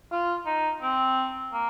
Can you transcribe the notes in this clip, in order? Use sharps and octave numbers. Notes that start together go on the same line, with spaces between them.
F4
D#4
C4
A#3